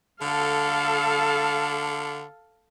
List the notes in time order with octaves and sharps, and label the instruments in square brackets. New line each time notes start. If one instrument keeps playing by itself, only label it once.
[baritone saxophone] D3 [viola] A4 F5